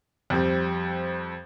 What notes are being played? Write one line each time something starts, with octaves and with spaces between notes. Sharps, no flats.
F2 G3 C4